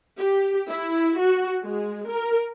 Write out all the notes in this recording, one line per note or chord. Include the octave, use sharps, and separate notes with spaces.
G4
E4
F#4
G#3
A#4